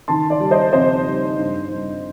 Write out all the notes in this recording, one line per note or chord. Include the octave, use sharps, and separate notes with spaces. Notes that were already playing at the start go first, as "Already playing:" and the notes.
D#3 A5 C6
D5
G3
C5 D#5
F2 C5 D#5
G3
G2
G2